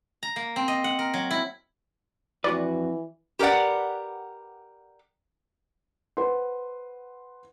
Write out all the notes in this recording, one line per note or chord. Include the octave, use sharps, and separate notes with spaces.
A#5
A#3
C4
D#5
F#5
A#4
F#3
E4
F2 E3 F#4 B4 D5
G4 A#4 B4 D5 F#5
B4 C5 F#5 C6